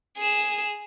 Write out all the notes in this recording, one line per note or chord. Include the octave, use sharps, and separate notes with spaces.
G#4 E7